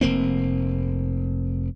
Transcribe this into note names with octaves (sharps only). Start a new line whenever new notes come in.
F1 A#3 C4